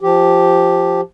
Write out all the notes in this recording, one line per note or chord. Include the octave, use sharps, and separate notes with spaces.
F3 G4